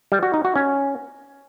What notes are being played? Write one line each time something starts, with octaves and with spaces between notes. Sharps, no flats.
G3
F#4
D#4
F#4
C#4